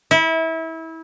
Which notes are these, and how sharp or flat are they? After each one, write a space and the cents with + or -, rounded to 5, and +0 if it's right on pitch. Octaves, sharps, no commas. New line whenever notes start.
E4 -25